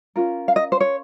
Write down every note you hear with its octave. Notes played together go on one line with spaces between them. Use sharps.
C#4 F4 A#4
F5
D#5
C5
C#5